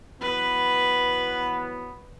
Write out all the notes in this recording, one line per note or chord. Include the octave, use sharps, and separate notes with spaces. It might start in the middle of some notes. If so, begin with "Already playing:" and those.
E3 F#3 B3 B4